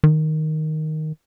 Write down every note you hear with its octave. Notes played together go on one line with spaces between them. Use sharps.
D#3